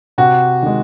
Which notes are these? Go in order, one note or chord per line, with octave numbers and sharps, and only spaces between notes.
C3 F#4
D#3 G#3